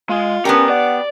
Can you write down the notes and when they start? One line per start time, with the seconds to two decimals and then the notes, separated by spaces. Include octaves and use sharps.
0.09 G#3 F4
0.45 B3 C#4 D4 G4 A#4
0.69 D5 F#5